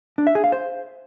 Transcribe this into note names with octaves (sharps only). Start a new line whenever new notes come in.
D4
E5
G#4
F5
C5